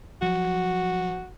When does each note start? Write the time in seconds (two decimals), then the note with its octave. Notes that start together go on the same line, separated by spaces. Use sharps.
0.22 F3 F#3 F#4